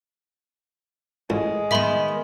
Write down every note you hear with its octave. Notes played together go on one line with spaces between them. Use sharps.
A1 G#3
D#3 B3 E5 B5 C6